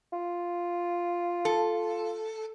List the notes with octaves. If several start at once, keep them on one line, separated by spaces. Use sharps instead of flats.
F4
A4